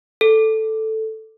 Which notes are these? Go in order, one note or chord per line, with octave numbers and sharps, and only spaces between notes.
A4